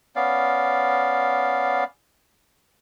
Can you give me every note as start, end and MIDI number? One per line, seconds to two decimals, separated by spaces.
0.16 1.84 59
0.16 1.84 61
0.16 1.84 74
0.16 1.84 77